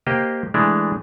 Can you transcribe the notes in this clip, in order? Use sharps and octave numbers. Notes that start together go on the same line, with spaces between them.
A#3 G4 C5 D#5 G5
E3 G#3 A3 D4 E4